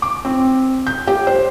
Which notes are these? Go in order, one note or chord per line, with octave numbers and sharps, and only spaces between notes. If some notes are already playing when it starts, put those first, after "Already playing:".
D6
C4
G6
G4
C5